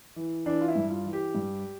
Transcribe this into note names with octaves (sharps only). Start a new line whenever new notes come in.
E3
E3 D4
F4
E4
G2
F4
E3
G4
G2